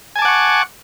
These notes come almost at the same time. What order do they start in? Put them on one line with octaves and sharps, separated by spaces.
G#5 A5 D6 F#5 C#6